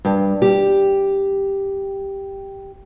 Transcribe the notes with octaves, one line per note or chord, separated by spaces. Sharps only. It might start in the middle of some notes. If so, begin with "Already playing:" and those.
G2
G4